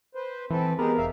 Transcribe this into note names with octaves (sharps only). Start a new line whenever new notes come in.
B4 C5
E3 C4 A4 B4
G#3 B3 G4 G#4 A#4
E1 E5 F5